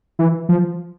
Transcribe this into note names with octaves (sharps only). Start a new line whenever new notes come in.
E3
F3